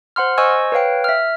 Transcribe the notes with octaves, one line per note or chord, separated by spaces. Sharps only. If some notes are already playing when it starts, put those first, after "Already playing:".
C5 F#5 C6 F6
C5 D#5 G#5 C#6 E6 G#6
B4 C#5 F5 G5
E5 F6